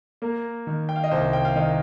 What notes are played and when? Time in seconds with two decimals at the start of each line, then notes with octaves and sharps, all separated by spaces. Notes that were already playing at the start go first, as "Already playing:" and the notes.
0.22 A#3 A#4
0.67 D#3
0.89 G5
0.96 F5
1.04 D#5
1.11 C2 C5
1.33 G5
1.45 F5
1.56 D#3 D#5